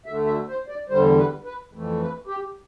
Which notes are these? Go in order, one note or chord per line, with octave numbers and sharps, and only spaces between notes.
D2 D3 A3 E5
E5
C5
D5
E2 D3 G3 C5
B4
B4
F2 E3 A3
B4
G4